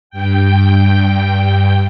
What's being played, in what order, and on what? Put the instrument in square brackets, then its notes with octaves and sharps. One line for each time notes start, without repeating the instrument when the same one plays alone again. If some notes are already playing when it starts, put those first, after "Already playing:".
[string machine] G2 G5